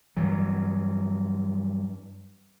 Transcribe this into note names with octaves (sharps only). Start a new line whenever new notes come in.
G2 E3 F#3